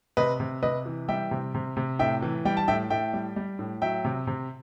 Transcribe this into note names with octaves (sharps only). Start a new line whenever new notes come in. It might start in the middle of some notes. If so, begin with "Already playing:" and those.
C3 B4 D#5
C3
C3 B4 D#5
E3
G3 E5 G5
C3
C3
C3
A2 E5 G5
E3
G3 G5
A5
A2 E5 G5
A2 E5 G5
G3
G3
A2
F#3 E5 G5
C3
C3